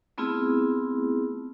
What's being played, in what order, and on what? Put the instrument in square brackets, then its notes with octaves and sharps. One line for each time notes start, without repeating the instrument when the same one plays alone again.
[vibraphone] A3 B3 C4 E4 F4 G#4